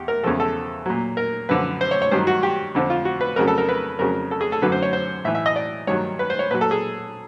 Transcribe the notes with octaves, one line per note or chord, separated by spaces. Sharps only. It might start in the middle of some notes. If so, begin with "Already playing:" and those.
Already playing: E2 G4
A#4
E2 C#3 F3 A4
A4
A#2 F#3
A#4
F#2 D3 F3 B4
C5
C#5
C#5
G2 D#3 F#3 C5
F#4
G4
F2 D3 F3
F4
F#4
B4
F2 C#3 F#3 A#4
A4
A#4
B4
F2 C#3 F#3 A#4
A4
G#4
A4
F#2 D3 F#3 B4
C5
C#5
C5
A2 E3 E5
E5
D#5
D5
G2 D#3 F#3 C#5
B4
C5
C#5
A#2 F#3 B4
A4
G#4